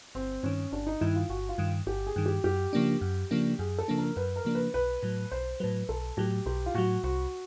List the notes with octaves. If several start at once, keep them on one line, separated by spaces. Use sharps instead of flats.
G1 C4
G2 D#3 C#4
G1 D4
D#4
G2 D#3 E4
F4
G1 F#4
F4
G2 D#3
G1 G4
G#4
G2 D#3
G4
F#2 G4
C#3 F3 A#3 D4
F#2
C#3 F3 A#3 D4
F#2 G#4
A4
C#3 F3 A#3 D4
A#4
F#2 B4
A#4
C#3 F3 A#3 D4
B4
B1 B4
A2 F#3
B1 C5
A2 F#3 B4
B1 A4
A2 F#3 G4
B1 G4
F4
A2 F#3 F#4
C2 F#4